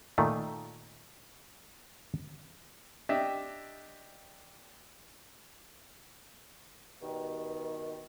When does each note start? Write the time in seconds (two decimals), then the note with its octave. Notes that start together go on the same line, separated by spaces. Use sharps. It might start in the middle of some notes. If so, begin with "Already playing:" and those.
0.18 A#2 D#3 A3
3.09 D4 G4 D#5 E5
7.02 G2 B2 D#3